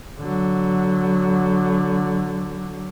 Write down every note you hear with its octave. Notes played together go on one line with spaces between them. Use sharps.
D3 F#3